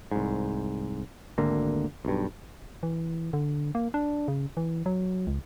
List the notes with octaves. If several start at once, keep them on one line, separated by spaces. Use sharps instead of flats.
C2 G#2
G#1 D2 D3 A#3
B1 G2
E3
D3
A#3
D4
C#3
E3
F#3
C#2